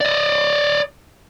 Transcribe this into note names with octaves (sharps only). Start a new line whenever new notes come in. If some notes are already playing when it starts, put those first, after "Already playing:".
D5 D#5